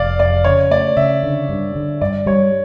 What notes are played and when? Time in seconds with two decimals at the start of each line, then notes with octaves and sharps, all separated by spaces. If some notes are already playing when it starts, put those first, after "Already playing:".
Already playing: F1 D5 F5
0.19 F2 D5
0.44 C#3 C#5
0.71 A3 D5
0.97 C#3 E5
1.23 D3
1.49 G2
1.76 D3
2.01 G2 D5
2.26 G3 C#5